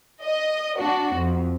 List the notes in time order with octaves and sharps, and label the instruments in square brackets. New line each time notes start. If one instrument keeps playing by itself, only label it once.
[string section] D#5
D4 F#4
F2